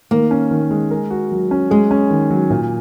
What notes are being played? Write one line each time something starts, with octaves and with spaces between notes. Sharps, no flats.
D#3 A#3
C#4
D#3
G#3
A#4
F#4
F#3
C#4
G#3 G#4
C#4
D#3
F#3
A#2